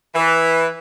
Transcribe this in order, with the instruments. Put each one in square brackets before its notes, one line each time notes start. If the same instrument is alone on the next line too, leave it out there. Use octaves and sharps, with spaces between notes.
[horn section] E3